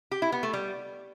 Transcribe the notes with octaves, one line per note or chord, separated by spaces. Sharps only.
G4
E4
B3
A3
G3